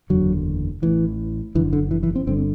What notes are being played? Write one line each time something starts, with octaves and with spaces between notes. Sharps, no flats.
F#1 E2 D3 F#3
A1 A2 E3
F#1 F#2 D3 E3
D3
E3
E3
C4
G1 G2 D3 C4